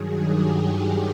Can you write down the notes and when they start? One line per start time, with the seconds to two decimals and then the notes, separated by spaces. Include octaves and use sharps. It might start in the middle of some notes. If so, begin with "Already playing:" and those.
Already playing: G2 D#3 F#3 G#4
0.30 G4